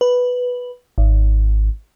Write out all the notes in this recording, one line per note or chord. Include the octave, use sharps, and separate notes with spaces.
B4
G#1